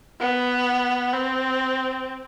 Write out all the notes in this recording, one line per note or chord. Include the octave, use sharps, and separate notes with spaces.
B3
C4